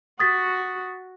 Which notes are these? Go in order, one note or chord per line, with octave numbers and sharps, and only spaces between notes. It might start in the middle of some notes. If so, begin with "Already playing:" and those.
F#4 D#6 A6 B6